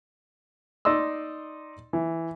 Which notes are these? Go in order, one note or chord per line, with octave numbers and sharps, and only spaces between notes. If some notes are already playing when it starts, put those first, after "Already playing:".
D#4 D5 D#5 C6 E6
E3